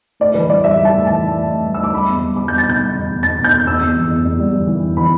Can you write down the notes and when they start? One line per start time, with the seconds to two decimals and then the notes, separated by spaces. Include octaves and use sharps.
0.20 A2 D5
0.34 E3 B4
0.49 G3 D5
0.64 G3 E5
0.78 G3
0.85 A5
0.93 A2
1.07 E3 A5
1.21 E3
1.36 A2
1.50 A2
1.64 G3
1.74 E6
1.79 A2 D6
1.93 G3 B5
2.09 E2
2.22 G3
2.36 G3 D6
2.48 E2 G6
2.58 A6
2.66 B2 G6
2.80 G3
2.95 E2
3.08 E2
3.23 E2 A6
3.38 B2
3.44 G6
3.52 E2
3.66 E2 E6
3.81 E2
3.96 E3
4.11 E2
4.25 E2
4.39 G3
4.53 E3
4.67 E3
4.83 E2
4.97 E3 B5